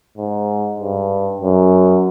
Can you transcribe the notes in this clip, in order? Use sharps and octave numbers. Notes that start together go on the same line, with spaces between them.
G#2
G2
F#2